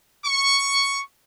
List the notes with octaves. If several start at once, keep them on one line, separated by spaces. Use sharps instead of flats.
C#6